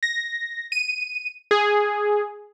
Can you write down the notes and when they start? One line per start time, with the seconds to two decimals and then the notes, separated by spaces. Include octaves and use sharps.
0.03 A#6
0.72 D#7
1.51 G#4